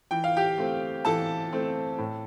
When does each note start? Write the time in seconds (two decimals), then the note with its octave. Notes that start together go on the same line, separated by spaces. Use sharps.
0.11 E3 G5
0.24 F5
0.36 G4 G5
0.58 A3 C4
1.05 E3 A4 A5
1.53 A3 C4
1.98 A2